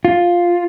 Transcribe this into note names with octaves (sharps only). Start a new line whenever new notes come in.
F4